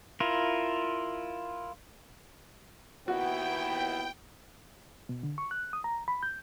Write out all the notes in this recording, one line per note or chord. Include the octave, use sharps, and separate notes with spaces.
E4 F4 A#4
D#2 B3 E4 F#4 G5
B2
D3
C#6
F#6
D#6
A#5
B5
G6